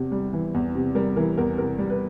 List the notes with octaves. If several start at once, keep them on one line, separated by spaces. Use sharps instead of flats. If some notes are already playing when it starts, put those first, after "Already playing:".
Already playing: E2 C3
G3
E3
E2
C3
G3 A#4
E3 A#4
E2 A#4
C3 A#4
G3
B4